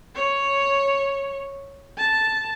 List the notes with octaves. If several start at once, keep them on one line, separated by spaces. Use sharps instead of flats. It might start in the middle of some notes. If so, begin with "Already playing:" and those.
C#5
A5